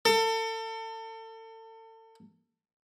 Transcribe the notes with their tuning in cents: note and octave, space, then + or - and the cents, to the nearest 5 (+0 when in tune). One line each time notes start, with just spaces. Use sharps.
A4 +35